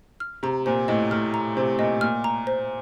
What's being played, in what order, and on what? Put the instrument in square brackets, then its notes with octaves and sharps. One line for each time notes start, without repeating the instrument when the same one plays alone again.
[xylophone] F6
[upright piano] C3 [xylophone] A#5
[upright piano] A#2 [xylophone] C5
[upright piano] A2 [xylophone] D#5
[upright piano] A2 [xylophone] F6
[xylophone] A#5
[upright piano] C3 [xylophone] C5
[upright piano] A#2 [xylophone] D#5
[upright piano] A#2 [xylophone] F6
[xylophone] A#5
C5